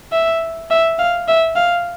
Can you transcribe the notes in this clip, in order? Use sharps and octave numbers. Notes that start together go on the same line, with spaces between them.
E5
E5
F5
E5
F5